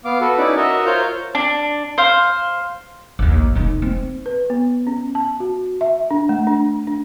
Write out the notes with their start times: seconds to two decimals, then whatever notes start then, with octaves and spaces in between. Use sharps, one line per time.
0.05 B3 F5 D6
0.21 F#4 A4 B4
0.38 C#4 D#4 E4 B4 D5
0.57 F#4 A#4 D#5 E5
0.86 F4 A#4 C5 C#5 F5 G6
1.35 D4
1.98 C5 F5
3.19 A#1 D#2
3.55 E1 D#4
3.82 C4
4.26 B4
4.50 B3
4.87 C#4
5.15 A5
5.40 F#4
5.81 E5
6.11 D4
6.29 A3
6.47 D4
6.87 D4